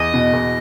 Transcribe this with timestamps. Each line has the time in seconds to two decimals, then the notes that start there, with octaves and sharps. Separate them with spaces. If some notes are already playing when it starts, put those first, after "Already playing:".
Already playing: E2 D#5
0.14 B2
0.33 E2